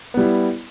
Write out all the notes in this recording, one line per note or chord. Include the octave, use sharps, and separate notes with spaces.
G3 B3 E4